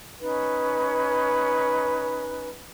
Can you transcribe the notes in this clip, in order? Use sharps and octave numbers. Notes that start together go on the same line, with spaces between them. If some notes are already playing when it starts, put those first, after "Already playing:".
C#4 D#4 B4